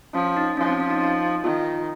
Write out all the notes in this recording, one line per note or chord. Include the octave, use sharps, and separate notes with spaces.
F3 C#4
D#4
F3 C#4
C4
C#4
D#4
D#4
D#3 F4